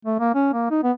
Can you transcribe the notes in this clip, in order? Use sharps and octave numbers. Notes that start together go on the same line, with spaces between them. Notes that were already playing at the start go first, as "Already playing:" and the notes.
A3
A#3
C#4
A#3
D#4
B3